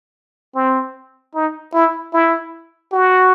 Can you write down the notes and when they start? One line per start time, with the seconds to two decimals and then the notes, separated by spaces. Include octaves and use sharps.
0.55 C4
1.35 D#4
1.74 E4
2.13 E4
2.92 F#4